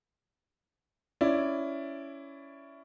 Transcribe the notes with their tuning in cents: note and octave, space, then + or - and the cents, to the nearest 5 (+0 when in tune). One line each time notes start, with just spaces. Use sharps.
C#4 +10 E4 +10 D5 +0